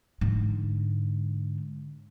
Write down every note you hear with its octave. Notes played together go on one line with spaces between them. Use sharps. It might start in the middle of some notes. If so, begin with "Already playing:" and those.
G#2 D3